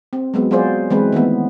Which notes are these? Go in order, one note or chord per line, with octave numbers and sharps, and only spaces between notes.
C4
F#3 G#3 B3
F#3 F4 G#4 C5 D5
E3 G#3 C4 B4
D#3 E3 A3 B3